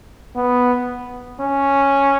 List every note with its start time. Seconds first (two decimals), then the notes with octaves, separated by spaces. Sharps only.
0.36 B3
1.41 C#4